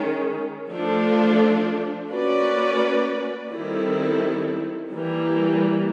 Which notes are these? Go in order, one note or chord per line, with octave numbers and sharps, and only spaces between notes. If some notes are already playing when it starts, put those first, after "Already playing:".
Already playing: D#3 G#3 C#4
F3 A3 D4 F4 A4
A#3 C#4 F#4 B4 D5
D#3 G3 C4 E4 A4
E3 G3 A#3